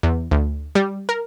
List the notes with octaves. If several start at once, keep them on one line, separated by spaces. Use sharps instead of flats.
E2
D2
G3
A#4